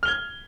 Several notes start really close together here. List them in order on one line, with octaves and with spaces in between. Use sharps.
F6 G7 G#6